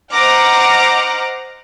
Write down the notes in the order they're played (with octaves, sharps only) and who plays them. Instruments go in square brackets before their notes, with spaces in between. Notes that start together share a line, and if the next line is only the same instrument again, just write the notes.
[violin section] C5 D#5 F#5 A#5 D6 F6